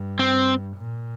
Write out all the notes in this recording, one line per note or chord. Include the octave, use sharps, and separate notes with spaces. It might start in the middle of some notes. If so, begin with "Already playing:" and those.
Already playing: G2
C4
A#2